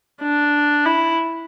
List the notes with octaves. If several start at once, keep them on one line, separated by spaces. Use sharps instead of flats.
D4
E4